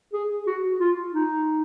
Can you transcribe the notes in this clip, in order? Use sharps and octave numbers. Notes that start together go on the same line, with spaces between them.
G#4
F#4
F4
D#4